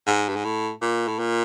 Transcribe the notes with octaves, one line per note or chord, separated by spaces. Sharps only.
G#2
G2
G#2
A2
A#2
A2
A#2